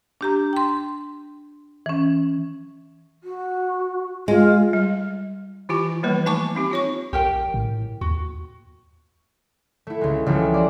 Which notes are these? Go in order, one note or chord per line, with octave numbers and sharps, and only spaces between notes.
D4 G4 A#5
G5 C6
E3 C#4
F#4
G#3 F4
G3
E3 E4 F4 G4 G#5
E3 F3 G3 A#3 B3 B4
A3 D#4 G#5 A5 C#6 D6
C4 D#4 G4
F4 C#5 C#6
A#1 G4 A#4 G5
A2
D#2 F#4
A3 E4
C#2 G#3
C#2 C#3 E3 F3 G3 A3
C5 D5